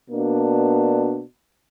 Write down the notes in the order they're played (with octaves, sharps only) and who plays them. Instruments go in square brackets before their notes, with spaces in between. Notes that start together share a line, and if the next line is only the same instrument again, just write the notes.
[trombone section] B2 A#3 D4